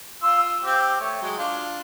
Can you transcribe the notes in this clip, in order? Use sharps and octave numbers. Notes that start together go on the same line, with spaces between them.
F4 C6 E6
C4 G4
A3 C#5
F#3 G#3
D4 F4